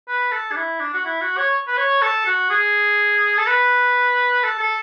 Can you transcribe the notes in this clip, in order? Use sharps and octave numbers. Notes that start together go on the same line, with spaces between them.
B4
A4
D4
E4
D4
F#4
E4
F#4
C#5
B4
C#5
A4
F#4
G#4
A4
B4
A4
A4